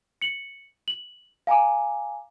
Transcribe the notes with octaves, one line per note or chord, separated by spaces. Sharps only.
C#7 F#7
F#7
F5 G#5 A#5 D6